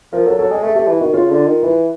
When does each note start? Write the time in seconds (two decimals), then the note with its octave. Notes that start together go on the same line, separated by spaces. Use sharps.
0.13 F3 A#4
0.26 F#3 A4
0.38 F#3 A4
0.51 G#3 G#4
0.63 A3 A4
0.75 A3 G4
0.88 E3
1.01 D#3 F#4
1.13 C#3 F4
1.30 D3
1.46 D#3
1.63 E3 B4